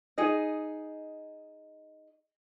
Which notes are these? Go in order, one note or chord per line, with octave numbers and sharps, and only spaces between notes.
D#4 G#4 D#5